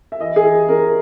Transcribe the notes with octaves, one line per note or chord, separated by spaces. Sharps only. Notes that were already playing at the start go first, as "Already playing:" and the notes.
E5
E3 D#5
G#4
E3
C#4 A#4